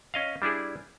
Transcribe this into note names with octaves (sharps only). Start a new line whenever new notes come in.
C#4 D#5 F5
G3 D4 E4 G#4